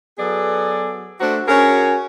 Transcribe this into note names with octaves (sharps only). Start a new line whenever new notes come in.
F#3 B3 G#4 A4 D5
A3 D4 F#4 C5
C#4 F#4 G#4 A#4 C#5